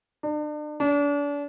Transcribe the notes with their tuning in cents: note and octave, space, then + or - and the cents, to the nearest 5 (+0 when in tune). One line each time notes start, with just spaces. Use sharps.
D4 +40
D4 -35